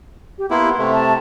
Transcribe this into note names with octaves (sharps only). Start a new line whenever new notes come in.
G4
A#3 B3 E4 C6
C3 A3
A5